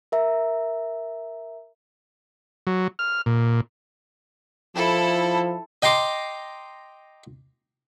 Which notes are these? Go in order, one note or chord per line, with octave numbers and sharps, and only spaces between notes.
A#4 E5 A#5
F#3
F6
A#2
F3 E4 A4
D#5 G5 A#5 C6 D6